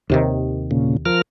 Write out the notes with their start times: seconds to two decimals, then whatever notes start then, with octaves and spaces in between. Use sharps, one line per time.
0.10 D#2 C3 D#3
0.71 A#2 C#3
1.06 F3 A#4 F6